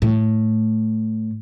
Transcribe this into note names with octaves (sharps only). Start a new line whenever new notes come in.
A2